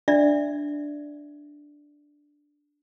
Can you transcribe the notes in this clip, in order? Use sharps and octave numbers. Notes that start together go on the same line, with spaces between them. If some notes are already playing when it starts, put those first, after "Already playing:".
D4 D5 E5